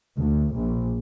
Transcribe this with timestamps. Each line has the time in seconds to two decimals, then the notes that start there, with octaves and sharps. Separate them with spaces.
0.17 D2
0.54 A#1